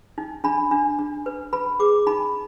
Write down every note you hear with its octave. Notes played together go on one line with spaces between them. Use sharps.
D#4
D4 B5
D4
D4
B4
B4 B5
G#4 D6
D#4 B5